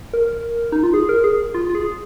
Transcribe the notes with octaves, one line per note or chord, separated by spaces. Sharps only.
A#4
D#4
F4
G#4
A#4
G#4
F4
F4
G#4